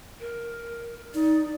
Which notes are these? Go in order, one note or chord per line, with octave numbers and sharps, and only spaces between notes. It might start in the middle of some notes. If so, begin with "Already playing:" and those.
A#4
D#4 D5